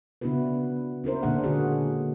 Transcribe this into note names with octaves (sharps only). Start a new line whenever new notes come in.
C#3 B3 D4 E4 F#4 B4
C#4 E4 A#4 C5
A#2 D3 A#3 D4 G#4 F#5
D3 F#4 G#4